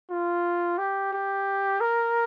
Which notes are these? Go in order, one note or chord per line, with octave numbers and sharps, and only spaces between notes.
F4
G4
G4
A#4